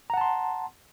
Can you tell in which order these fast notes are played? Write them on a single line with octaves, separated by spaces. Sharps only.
A#5 F#5 A5 C6